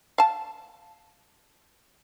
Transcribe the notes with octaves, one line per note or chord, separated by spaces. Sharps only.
F5 A5